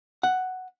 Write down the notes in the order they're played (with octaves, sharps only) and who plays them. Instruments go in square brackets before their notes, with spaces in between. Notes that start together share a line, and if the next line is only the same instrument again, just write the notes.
[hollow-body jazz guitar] F#5